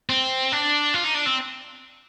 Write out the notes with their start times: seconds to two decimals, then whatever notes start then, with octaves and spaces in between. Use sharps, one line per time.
0.10 C4
0.52 D4
0.94 F4
1.04 D#4
1.14 D4
1.26 C4